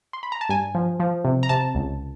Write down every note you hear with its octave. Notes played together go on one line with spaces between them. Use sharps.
C6
B5
A#5
A5
G2 G#5
F3
F3
C3
A#5
C3 A5
C#2